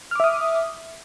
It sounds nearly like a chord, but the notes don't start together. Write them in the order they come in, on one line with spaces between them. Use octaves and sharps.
F6 D6 E5 D#6